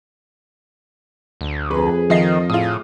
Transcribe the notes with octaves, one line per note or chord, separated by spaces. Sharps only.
D2
F2 G#4 B4
D#3 F3 D#5 C7
A2 F4 G#4 D#6